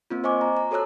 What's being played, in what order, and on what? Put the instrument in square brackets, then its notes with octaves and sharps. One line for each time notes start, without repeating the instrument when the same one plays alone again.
[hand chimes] A#3 C4 F4
C5 D#5 G#5 C#6 D6
A#5
A#5
F#4 A4 C#5 A5 E6 F#6